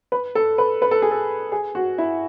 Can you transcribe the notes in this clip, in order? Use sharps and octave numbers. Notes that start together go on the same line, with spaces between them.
B4
A4
B4
B4
A4
G#4
A4
G#4
F#4
E4